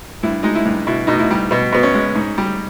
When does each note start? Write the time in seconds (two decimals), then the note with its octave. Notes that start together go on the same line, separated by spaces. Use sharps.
0.23 G2 E4
0.43 G#3 D#4
0.55 E4
0.65 G2
0.87 B2 E4
1.07 B2 D#4
1.19 E4
1.31 G3
1.51 B2 B3
1.72 B2 B3
1.83 C#4
1.94 G#3
2.16 G#2
2.38 G3